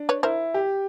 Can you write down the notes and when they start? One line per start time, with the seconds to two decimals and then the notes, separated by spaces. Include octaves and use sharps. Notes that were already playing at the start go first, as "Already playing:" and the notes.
Already playing: D4
0.09 B4 C#5
0.23 E4 A#4 C5
0.54 G4